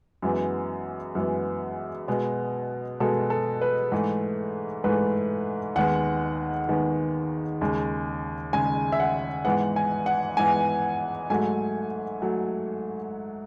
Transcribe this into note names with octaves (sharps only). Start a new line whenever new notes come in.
F#2 E3 G#3 B3
F#2 E3 G#3 B3
B2 G#3 B3
B2 G#3 B3 A4
A4
B4
G#2 E3 A3
G#2 E3 A3 B4
D#2 D#3 G#3 B3 F#5
D#2 D#3 G#3 B3
D#2 C#3 G#3
D#2 C#3 G#3 G#5
E5
F#5
G#2 E3 B3 F#5
G#5
F#5
G#2 E3 B3 G#5
G#2 F#3 A3 G#5
F#3 A3